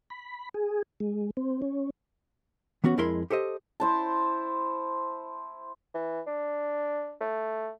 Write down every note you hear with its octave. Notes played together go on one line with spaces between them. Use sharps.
B5
G#4
G#3
C4
C#4
E3 B3 C#4 F#4
F2 G#3 E4 A#4 B5 C6
G4 A4 C5 D#5
E4 C5 A5
E3
D4
A3